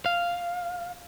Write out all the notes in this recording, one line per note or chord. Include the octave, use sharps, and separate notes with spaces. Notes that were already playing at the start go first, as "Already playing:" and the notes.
F5